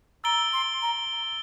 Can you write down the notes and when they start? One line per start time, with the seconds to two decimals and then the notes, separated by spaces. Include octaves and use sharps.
0.24 A#5 E6 A6 D7 G7
0.53 C6
0.82 A#5